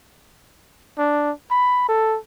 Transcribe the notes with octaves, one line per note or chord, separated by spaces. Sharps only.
D4
B5
A4